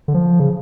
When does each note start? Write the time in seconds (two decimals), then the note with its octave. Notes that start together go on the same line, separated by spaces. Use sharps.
0.08 D3
0.14 F3
0.39 C#3